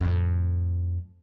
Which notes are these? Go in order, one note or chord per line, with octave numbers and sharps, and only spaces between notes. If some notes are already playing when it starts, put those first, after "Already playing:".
F2 A2